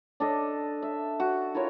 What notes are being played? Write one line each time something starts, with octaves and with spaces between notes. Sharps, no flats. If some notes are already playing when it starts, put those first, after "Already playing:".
D4 A4 D#5
E5
F#4
E4 F4 A#4 C#5